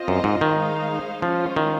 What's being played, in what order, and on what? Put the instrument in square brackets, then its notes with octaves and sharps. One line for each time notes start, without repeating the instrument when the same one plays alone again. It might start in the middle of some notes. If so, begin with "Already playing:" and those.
Already playing: [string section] C4 F4 C5 D#5
[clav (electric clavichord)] F#2
G#2
D#3
[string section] G#3 D#4 G#4 C5 F5
[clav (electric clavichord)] F3 [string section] G#3 C#4 F4 C5
[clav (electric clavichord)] D#3